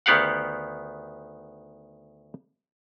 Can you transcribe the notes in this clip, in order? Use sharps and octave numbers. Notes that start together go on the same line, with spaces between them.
D2 D#3 B3 G4 F5 F#5